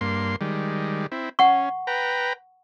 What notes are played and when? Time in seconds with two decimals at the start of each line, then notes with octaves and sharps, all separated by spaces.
0.01 G2 A#3 C6
0.41 D#3 G3 G#3
1.12 C4 E4
1.39 C#4 F#5 C#6
1.87 B4 G5 A#5